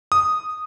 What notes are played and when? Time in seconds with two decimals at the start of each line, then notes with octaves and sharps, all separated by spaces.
0.12 D#6